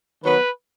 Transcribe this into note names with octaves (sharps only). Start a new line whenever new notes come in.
D#3 F#3 B3 B4